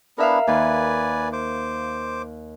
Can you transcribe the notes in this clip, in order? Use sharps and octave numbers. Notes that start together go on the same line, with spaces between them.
B3 D4 E4 A#4 E5 F5
D#2 B4 D5 G#5
C5 D6